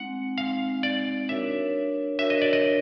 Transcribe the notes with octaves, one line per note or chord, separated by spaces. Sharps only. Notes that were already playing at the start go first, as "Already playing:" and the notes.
Already playing: G#3 C4 D#4 F#5
G#3 C4 D#4 F5
D5
D4 F#4 A#4 C#5 E5
D4 F#4 A#4 C#5 E5
D#5
D5
D#5